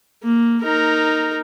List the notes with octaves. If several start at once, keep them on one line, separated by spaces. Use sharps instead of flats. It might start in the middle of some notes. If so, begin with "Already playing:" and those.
A#3
D#4 A#4